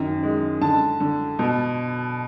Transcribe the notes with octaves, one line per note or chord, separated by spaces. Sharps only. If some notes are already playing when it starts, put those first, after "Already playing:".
Already playing: F#2 D#3
G#3
D3 A5
D3
B2